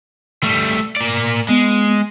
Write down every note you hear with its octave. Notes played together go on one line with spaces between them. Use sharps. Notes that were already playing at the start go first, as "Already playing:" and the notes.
G3 A3
A#3 D5
G#3 B3